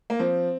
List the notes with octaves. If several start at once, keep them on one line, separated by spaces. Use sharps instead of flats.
A#3
F3 C4